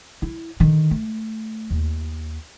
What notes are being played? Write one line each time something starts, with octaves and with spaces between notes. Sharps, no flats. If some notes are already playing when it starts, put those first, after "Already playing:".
E4
D3 D#3
A3
D#2